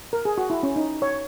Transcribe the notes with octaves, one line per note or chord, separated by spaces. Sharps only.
A#4
G#4
F#4
E4
C#4
D#4
C#5